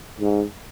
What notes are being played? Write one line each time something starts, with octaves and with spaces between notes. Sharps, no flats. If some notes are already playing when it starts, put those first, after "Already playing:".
G#2